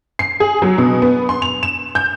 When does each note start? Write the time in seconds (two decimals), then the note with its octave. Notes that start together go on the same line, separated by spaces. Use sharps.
0.19 C7
0.40 G#4
0.62 F#3
0.78 B2
1.02 B3
1.29 C6
1.42 F7
1.63 E7
1.95 G6